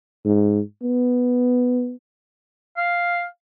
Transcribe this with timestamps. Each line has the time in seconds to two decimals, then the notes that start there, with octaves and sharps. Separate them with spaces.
0.25 G#2
0.83 B3
2.77 F5